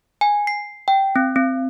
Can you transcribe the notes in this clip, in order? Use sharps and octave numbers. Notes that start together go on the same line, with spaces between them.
G#5
C7
G5
C4
C4